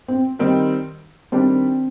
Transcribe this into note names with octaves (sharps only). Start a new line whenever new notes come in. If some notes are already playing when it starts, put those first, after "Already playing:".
C4
D#3 G3 C4 D#4
D#3 G3 C4 D4 G4